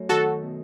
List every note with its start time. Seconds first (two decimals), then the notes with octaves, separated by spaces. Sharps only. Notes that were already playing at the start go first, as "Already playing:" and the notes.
Already playing: F#2 A3
0.09 D#3 F#4 A4
0.25 D#4
0.42 B2